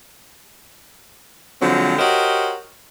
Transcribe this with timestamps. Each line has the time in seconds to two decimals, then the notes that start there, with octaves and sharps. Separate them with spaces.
1.62 D3 F3 F#3 G#3 C4
1.98 F#4 G4 A#4 C5 C#5 D#5